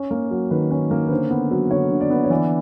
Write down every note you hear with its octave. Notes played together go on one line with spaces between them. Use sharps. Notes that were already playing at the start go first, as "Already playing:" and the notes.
Already playing: C#4
A#3
F#3
D#3 B4
C#4
A#3
B4
D3 C5
B3
F#3
D3 C#5
D3
D5
B3
C#5
E3 D5